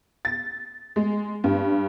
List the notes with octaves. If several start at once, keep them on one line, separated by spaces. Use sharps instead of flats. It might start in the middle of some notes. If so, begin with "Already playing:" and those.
A6
G#3
G2